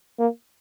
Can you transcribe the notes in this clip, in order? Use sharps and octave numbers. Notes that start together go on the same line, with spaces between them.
A#3